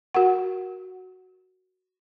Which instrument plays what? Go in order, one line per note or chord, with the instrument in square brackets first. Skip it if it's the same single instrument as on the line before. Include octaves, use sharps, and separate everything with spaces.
[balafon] F#4 A#4 F#5